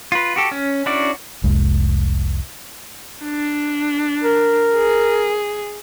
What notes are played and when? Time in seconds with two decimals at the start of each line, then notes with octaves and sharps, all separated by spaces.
0.12 F4 B4
0.36 F#4 G4 A4
0.51 C#4
0.86 C#4 D4 E4 F#4 D5
1.44 F1 C2 G#3
3.23 D4
4.24 A#4
4.75 G#4